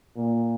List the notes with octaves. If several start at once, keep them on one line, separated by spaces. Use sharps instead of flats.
A#2